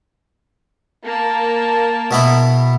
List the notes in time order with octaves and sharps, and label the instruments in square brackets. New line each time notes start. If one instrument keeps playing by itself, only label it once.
[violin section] A#3 A#4 A5
[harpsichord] B2 B3 E4